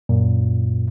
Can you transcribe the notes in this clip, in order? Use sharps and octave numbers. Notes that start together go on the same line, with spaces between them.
F#2 A#2